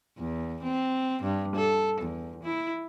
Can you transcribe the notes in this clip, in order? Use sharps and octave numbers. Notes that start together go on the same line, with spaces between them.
E2
C4
G2
A4
E2
E4